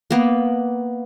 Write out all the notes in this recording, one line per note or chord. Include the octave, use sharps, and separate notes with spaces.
A#3 B3